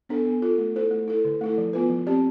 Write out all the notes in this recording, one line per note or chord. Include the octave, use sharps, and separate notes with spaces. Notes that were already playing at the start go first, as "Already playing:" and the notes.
B3 D4 A4
B3
F4 A4
A3
E4 A4 C5
A3
E4 A4
D3
A3 E4 A4
F3
B3 F4 B4
F3
C4 G4 D5